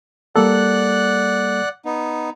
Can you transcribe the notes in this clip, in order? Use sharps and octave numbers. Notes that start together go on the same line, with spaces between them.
G3 A#3 A4 D5 F#5 F#6
B3 D#4